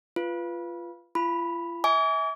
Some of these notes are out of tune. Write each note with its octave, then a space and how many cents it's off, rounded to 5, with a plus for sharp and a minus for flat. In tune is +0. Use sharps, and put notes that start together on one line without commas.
F4 -15 B4 +0
F4 -40 B5 +0
E5 -35 G#5 +0 D6 -45